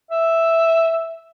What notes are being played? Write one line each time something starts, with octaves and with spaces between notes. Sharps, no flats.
E5